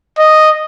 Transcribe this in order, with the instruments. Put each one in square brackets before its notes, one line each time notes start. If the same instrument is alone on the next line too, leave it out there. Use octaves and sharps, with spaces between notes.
[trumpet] D#5